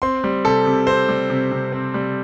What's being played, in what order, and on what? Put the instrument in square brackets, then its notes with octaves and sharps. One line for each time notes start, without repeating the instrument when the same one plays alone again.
[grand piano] C4 C6
G3
C3 A4
C3
C4 C5
G3
C3
C3
C4
G3